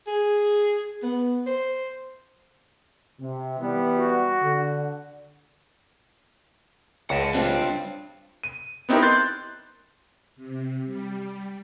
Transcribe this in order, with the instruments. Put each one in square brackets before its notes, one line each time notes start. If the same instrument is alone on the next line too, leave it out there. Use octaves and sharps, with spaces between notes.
[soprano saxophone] G#4
B3
C5
[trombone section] C3
E3 G3 B3
[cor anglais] F#4
[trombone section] D3
[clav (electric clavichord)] C#2 [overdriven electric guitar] F#5 A5
[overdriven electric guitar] G2 [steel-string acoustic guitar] C4 D4 F4
[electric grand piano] D#7
B3 C4 D#4 E4 G4 A#4
C6 F#6 G6 A6
[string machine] C3
G3